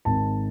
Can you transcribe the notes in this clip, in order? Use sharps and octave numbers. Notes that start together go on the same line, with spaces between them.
G#1 G#2 D#3 A5